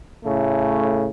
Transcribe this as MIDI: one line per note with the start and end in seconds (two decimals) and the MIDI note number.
0.25 1.11 45
0.25 1.11 49
0.25 1.11 57